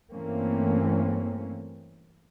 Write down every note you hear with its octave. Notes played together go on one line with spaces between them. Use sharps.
G2 E3 A3 A#3 C4 C#4